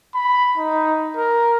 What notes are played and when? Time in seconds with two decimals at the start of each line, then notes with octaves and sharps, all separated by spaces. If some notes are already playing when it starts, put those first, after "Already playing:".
0.15 B5
0.58 D#4
1.16 A#4